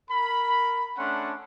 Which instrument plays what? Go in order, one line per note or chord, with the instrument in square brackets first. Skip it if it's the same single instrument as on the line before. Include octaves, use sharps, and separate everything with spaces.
[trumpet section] A#4 B5
A3 C#4 D4 F#5 C6